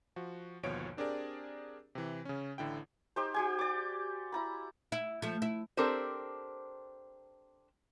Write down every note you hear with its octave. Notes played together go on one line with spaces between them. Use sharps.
F3 F#4
G1 D#2 B2 F3 C#5 D7
C4 D4 G4 G#4 A#4 D5
C3 E3
C#3 C#4
A1 D3 E4 G5
D#4 G4 C5
F#4 G4 G#5
D5 D6
E4 A#5 B5
E4
F3 A3
E4
C4 D4 G4 A4 A#4 C5